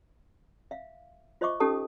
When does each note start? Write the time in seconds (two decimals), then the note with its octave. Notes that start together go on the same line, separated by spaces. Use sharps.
0.71 E5 F5
1.41 F4 C5 D#5 E5 C#6 D6
1.60 C#4 D#4 G4 A4 A5 D#6